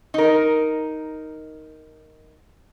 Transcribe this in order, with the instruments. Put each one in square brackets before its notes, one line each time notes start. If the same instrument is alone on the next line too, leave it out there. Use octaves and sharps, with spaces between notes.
[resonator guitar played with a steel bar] D#4 A#4